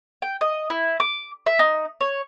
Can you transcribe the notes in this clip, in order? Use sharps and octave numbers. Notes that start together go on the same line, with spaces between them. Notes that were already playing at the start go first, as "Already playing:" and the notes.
G5
D#5
E4
D6
E5
D#4
C#5